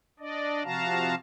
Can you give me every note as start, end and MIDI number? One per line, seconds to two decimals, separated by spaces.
0.19 0.63 62
0.19 0.63 74
0.19 0.63 75
0.64 1.15 48
0.64 1.15 53
0.64 1.15 66
0.64 1.15 77
0.64 1.15 81
0.64 1.15 82